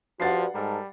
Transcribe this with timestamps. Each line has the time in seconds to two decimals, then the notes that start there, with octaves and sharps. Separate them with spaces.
0.20 G2 F3 F#4 F#5 A6 C7
0.55 G#2 G3 A4 A#4